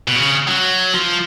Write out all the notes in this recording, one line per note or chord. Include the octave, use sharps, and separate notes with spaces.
B2
C#3
F#3
F3